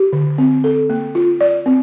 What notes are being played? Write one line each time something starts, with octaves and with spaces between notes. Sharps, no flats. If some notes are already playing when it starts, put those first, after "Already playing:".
Already playing: G4
D3
C4
A4
A#3
F4
D5
C4